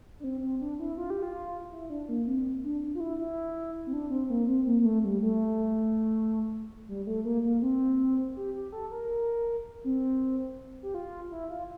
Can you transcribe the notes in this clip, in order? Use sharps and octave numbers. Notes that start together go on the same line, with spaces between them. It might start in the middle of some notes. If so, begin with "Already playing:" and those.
D4
C4
C4
D4
E4
F4
G4
F4
E4
D4
A#3
C4
D4
F4
E4
E4
C4
D4
C4
A#3
C4
A#3
A#3
A3
G3
A3
G3
A3
A#3
A#3
C4
G4
G4
A4
A#4
C4
G4
F4
E4
F4